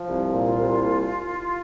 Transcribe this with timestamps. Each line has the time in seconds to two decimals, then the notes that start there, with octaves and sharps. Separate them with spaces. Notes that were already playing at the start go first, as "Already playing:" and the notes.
Already playing: F3
0.08 C2
0.33 A#2
0.45 F4
0.57 C2